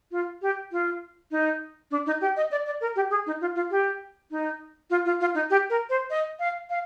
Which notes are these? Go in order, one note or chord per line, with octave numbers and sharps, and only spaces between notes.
F4
G4
F4
D#4
D4
D#4
G4
D#5
D5
D5
A#4
G4
G#4
D#4
F4
F4
G4
D#4
F4
F4
F4
D#4
G4
A#4
C5
D#5
F5
F5